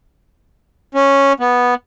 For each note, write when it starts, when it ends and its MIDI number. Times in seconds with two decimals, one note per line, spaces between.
0.95 1.33 61
1.40 1.74 59